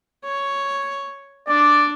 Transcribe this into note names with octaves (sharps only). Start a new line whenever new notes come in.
C#5
D4 D5